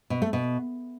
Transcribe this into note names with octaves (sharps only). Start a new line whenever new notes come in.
B2
A3
B2